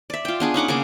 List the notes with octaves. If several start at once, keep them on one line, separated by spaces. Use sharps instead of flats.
D5 E5
F4 G5
B3 D4 G#4
C#4 D#4 F#5 D6
C#3 A#3 G#4 D6